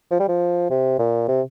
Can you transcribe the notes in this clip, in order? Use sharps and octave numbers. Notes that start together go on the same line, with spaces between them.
F3
G3
F3
C3
A#2
C3